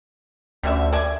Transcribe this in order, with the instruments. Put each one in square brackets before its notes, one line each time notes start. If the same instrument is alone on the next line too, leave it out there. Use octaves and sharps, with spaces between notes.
[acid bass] D2 [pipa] G3 C#4 E5
[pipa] D5 E5 G#5